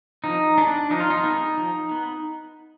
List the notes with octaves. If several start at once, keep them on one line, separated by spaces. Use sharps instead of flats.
F3 D#4
G#3 B3 D4
F3 D#4
F4
D#4
G#3 B3
F3
B3